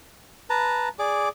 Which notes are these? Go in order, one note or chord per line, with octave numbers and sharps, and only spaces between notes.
B4 A5 A#5
G#4 D5 D6